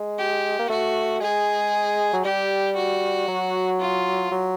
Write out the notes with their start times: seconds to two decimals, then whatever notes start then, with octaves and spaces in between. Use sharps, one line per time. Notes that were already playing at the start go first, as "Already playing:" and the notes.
Already playing: G#3
0.18 G4
0.59 A#3
0.69 A3 F#4
1.21 G#3 G#4
2.13 F#3
2.24 G3 G4
2.76 F#4
3.28 F#3
3.80 F4
4.31 F#3